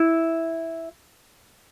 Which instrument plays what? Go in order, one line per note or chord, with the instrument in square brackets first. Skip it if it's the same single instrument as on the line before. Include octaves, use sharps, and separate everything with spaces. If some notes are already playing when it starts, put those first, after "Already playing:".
Already playing: [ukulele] E4